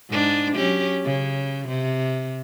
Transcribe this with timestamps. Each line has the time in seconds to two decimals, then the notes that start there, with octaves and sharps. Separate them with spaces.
0.11 G#2 D4
0.55 F#3 C#4 G4
1.05 C#3
1.69 C3